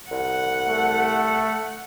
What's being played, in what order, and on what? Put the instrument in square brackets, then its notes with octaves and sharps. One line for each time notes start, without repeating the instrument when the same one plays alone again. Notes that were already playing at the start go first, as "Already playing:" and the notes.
[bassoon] C2 [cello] F#5
[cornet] A3